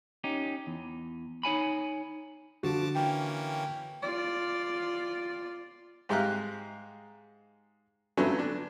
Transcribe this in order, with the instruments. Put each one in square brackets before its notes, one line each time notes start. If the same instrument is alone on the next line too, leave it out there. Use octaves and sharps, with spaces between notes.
[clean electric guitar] C#4 D#4 G4
E2
D#4 C#5 G#5 B5
[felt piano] D3 F#4 [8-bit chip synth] F3 A5 D6
[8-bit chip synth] E3 A#3 C#4 [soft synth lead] G5
[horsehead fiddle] F4 D5
[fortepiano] G#2 G#3 G4 F5 A#5 F#6
F2 D3 F#3 A3 B3 C#4
D3 D4